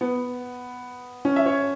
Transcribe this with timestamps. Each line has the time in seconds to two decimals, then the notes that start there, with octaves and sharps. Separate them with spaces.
0.01 B3
1.25 C#4
1.36 E5
1.46 C#5